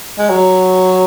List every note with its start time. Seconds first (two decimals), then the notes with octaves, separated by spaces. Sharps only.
0.19 G#3
0.30 F#3